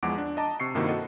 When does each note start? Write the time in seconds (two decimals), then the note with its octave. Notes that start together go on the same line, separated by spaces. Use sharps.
0.03 E2 F3 G#3 F#5 D6 D7
0.18 D4
0.37 D#5 A5 A#5 D6
0.60 C3 C#6 C7 C#7
0.75 G2 C3 D#3 A#3 E4 F#4
0.89 F#4 A4 D#5 F#5